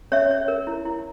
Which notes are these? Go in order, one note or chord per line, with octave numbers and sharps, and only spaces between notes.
C#4 C#5 E5
C#5
A#4
E4
E4